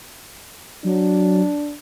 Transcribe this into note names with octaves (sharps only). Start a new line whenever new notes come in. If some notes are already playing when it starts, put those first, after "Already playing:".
F#3 D4